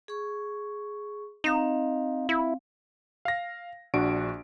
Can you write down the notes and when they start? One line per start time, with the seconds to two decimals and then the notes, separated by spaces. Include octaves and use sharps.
0.08 G#4 C#6
1.44 C4 D#4 F5
2.29 E4
3.25 F5 A#6
3.94 A#1 D4 F#4 D7